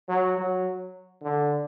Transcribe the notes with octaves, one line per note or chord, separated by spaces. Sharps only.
F#3
F#3
D3